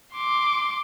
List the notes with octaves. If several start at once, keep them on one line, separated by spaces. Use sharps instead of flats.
C6 D6